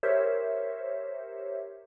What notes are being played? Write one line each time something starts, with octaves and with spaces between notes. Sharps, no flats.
G4 A#4 C5 C#5 E5